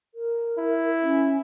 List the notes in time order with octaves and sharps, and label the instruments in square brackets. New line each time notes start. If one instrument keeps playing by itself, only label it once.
[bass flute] A#4
[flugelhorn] E4
[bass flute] C#4